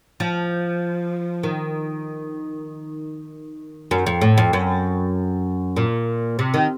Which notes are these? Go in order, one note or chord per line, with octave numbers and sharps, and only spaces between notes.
F3
D#3
F#2
F2
A2
F2
F#2
A#2
C3
D#3